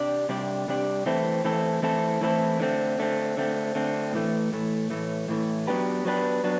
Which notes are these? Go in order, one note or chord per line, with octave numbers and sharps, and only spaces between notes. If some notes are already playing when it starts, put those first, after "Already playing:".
Already playing: C3 D4 G4 D5
C3 G3 D4 G4 D5
C3 G3 D4 G4 D5
E3 A3 C4 E4 A4
E3 A3 C4 E4 A4
E3 A3 C4 E4 A4
E3 A3 C4 E4 A4
D3 A3 C4
D3 A3 C4
D3 A3 C4
D3 A3 C4
A2 E3 A3
A2 E3 A3
A2 E3 A3
A2 E3 A3
F#3 B3 D4 G4 B4
F#3 B3 D4 G4 B4
F#3 B3 D4